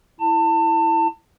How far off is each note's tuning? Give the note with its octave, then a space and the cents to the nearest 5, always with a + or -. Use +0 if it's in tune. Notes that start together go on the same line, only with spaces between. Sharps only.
E4 +0 A5 +30